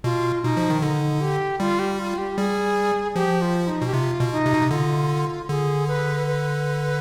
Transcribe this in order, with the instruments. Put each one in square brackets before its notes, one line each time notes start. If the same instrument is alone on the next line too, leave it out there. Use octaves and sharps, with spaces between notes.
[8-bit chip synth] B2 [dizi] F4
[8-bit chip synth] B2 [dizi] D#4
[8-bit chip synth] F3
D#3
[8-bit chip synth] D3 [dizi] D#4
[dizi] G4
[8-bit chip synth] G3 [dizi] F4
[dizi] G4
F4
G4
[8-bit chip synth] G3 [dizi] G#4
[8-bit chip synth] F3 [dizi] G4
[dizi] F4
D#4
[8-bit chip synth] B2
[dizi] G4
[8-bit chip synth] C3 [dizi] F4
[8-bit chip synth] B2
[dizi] D#4
[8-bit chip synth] C3
B2
C3
[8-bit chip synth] D3 [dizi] F4
[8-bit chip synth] D3 [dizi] G#4
[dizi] B4
B4